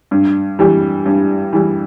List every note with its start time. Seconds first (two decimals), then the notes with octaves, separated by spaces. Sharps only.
0.11 G2
0.59 E3 G3
1.06 G2
1.53 E3 G3